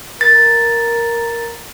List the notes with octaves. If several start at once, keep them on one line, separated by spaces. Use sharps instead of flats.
A#4 A6